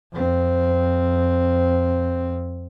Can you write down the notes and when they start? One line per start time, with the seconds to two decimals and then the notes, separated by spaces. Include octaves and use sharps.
0.12 F2 C4